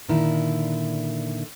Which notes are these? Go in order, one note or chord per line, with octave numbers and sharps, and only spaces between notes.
A#2 D3 D#3 E4